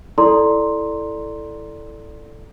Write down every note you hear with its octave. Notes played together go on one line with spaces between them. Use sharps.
E4 A4 D5 A#5 C6